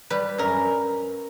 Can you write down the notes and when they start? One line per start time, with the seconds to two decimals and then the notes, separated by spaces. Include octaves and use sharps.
0.10 G3 B4
0.38 F#2 A#4